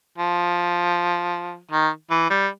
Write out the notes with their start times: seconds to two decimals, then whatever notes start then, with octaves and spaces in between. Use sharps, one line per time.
0.18 F3
1.71 D#3
2.10 E3
2.30 G3